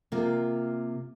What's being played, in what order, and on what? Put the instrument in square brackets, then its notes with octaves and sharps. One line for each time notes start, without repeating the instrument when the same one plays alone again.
[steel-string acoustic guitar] C3 A#3 F4